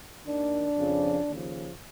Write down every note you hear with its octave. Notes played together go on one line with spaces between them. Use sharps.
D#2 D#3 D4
F2 C#3 F3
D#2 C#3 F3